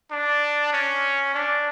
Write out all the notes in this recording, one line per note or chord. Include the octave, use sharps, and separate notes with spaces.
D4
C#4
D4